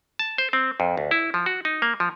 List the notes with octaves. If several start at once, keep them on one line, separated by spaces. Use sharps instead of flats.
A5
C5
C4
F2
D2
E4
F3
F#4
D#4
A#3
F3